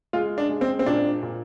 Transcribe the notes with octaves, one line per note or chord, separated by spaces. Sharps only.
G#3 F4
D4
G#3
C4
C4
A#2 D4
A#2